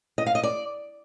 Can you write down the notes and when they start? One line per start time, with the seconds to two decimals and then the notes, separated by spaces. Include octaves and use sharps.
0.18 D#5
0.26 F5
0.35 D#5
0.43 D5